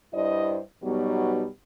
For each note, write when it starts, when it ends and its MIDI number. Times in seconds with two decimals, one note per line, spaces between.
0.13 0.59 43
0.13 0.59 64
0.13 0.59 72
0.13 0.59 74
0.13 0.59 75
0.83 1.46 47
0.83 1.46 54
0.83 1.46 55
0.83 1.46 59
0.83 1.46 63